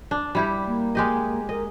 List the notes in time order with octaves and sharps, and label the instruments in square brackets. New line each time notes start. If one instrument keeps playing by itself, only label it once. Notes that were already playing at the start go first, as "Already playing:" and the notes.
[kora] D4
G3 E4 G4
[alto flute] A#3
[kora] G#3 G4 D#5
[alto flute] A#4 [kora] D#5